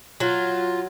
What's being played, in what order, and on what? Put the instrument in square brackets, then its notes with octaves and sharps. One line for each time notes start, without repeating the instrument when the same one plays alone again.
[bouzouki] F#3 [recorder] F4